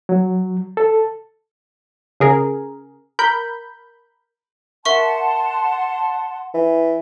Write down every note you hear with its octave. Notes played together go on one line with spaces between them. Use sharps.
F#3
A4
C#3 G#4 A#4
A#4 B5 G6
A#4 E5 F#5 A5 C6 C#6
E3